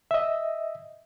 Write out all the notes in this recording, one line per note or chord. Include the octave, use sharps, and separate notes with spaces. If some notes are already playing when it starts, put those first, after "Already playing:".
D#5 E5